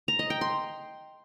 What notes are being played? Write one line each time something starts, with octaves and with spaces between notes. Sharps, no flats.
A#5
D#5
G5
C6